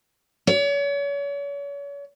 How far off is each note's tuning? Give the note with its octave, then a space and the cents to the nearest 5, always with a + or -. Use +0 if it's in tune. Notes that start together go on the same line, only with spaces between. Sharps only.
C#5 +40